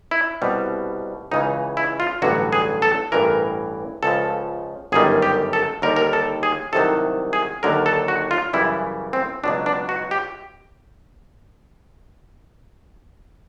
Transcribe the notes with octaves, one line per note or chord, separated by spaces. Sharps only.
E4
C2 B2 G3
C#2 C#3 E3 D#4
E4
F4
A1 G2 D3 F#3 F#4
G#4
A4
A1 G2 E3 A#4
C#2 C#3 F3 A4
G1 F#2 D#3 G3 G#4
G4
A4
D#2 D3 G3 A#4
A#4
A4
G#4
C2 C3 D#3 F#3 A4
G#4
D#2 D3 F#3 A#4
A4
F#4
F4
F#2 C#3 E3 G3 E4
C4
C#2 B2 F#3 D4
D4
F#4
G4